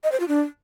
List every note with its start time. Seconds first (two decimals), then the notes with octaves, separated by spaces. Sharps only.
0.04 D#5
0.12 C5
0.20 F4
0.28 D4